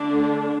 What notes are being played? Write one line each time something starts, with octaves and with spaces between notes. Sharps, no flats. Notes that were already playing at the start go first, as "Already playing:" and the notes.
Already playing: D3 A3 D4